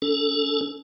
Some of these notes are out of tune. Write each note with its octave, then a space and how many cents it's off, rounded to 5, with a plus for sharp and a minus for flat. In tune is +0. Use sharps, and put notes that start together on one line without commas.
C#4 +45 A4 +0